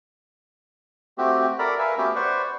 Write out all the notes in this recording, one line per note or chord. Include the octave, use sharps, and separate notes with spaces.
A3 C4 F#4 G4
A4 A#4 D5 A#5 B5
A#4 B4 E5 F5 G#5
A3 B3 C#4 F#4 G4 B4
B4 C5 D5 F#5 C#6